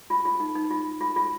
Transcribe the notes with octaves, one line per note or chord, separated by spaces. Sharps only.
F4
F4
D#4
D#4
F4
F4
F4